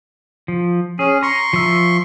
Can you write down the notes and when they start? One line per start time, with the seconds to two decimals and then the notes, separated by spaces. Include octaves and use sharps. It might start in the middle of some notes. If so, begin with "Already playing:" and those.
0.48 F3
0.99 C#4 G#4
1.23 A#5 C6 C#6
1.53 F3 E5